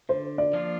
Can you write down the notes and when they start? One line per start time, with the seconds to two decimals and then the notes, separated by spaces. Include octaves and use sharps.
0.09 D3 C5
0.38 D5
0.53 F3 A#3 D4 F4